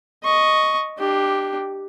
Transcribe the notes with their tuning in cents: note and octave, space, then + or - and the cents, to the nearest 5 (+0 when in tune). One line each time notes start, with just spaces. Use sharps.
D#5 +0 C#6 +0
D4 +25 G4 +0